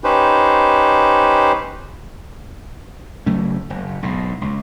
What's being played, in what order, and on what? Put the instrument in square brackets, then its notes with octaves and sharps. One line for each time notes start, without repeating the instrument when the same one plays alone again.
[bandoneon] C#4 D#4 G4 B4 C5
[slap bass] C#3 F#3 A3 C#4
F#1
B1 G#2
C#2